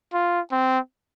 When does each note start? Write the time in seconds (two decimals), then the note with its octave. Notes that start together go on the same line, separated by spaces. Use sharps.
0.13 F4
0.52 C4